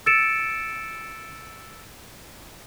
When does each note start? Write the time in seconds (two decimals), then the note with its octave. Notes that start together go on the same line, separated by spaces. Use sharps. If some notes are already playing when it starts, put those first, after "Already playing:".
0.06 E6 A6 C#7 D7 E7